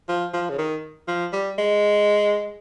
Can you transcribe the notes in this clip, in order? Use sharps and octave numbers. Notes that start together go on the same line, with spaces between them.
F3
F3
C#3
D#3
F3
G3
G#3